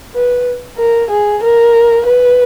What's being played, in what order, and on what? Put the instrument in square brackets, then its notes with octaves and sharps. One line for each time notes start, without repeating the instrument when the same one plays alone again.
[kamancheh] B4
A#4
G#4
A#4
B4